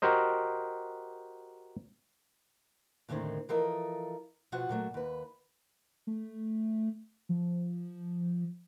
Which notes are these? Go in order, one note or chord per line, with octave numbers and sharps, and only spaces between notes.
F#4 G4 A#4 C5 D#5
D#2 A2 D3 D#3 C4
E3 F3 A4 A#4 D#5
B2 F3 F4 F#4 F#5
A#2 F#3 A3
D#2 B4
A3
F3